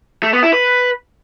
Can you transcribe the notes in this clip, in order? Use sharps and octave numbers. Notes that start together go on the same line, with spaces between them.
A3
B3
E4
B4